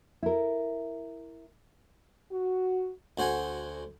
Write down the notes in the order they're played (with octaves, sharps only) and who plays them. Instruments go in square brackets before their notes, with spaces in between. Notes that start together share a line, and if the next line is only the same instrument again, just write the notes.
[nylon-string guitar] E4 A#4
[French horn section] F#4
[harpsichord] D2 F#4 C5 F#5 G#5